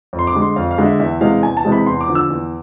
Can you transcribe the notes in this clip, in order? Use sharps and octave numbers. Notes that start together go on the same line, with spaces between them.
F2
C6
D6
D3 G#3
C6
F2 F5
F5
D3 G#3
E5
E2 E5
C3 E3 G#3 F5
E2 G#5
A5
C3 E3 G#3
B5
E2 C6
D6
D3 F3
E6
E2